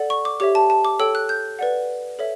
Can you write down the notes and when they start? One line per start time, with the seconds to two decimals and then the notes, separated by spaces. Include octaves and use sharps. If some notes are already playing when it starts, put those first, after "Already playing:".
Already playing: A4 D5 F#5
0.10 C#6
0.25 D6
0.40 G4 C#5 E5 D6
0.55 A5
0.70 A5
0.85 D6
0.99 A4 C#5 G5 E6
1.15 F#6
1.29 G6
1.59 B4 D5 F#5
2.19 A4 C#5 E5